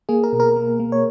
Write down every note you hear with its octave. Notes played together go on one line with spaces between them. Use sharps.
A#3 G#4
A#4
B2
A#4
A#3
A#3
C#5